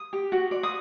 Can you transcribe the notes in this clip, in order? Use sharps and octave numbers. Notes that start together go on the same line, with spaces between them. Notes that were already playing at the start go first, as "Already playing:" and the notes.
Already playing: D#6
G4
F#4
D5
D#6